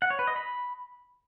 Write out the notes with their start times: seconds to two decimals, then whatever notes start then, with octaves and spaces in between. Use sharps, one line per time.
0.02 F#5
0.10 C#5
0.19 B4
0.27 D#5
0.36 B5